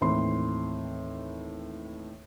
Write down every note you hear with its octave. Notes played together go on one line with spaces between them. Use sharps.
D#2 A2 E3 C4 C6